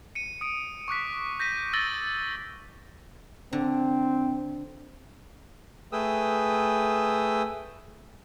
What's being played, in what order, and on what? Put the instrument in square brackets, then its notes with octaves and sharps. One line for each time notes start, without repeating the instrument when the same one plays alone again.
[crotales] C#7 D#7
D#6 D7
C#6 D6 F#6 B6
G6 A#6 B6 D#7
E6 G6 A6 A#6 F#7 G7
[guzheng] D3 [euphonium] C4
[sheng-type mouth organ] A3 G#4 B4 G5 D#6 E6